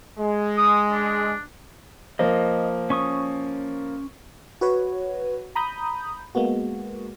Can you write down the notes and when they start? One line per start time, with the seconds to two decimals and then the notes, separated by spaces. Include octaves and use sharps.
0.18 G#3
0.57 D#6
0.91 D4
2.19 F3 A#3 D#5
2.90 C#4 C#6 D#6
4.61 F#4 B4 C#5
5.55 A#5 B5 D#6 G6
6.35 G#3 A#3 B3 F#4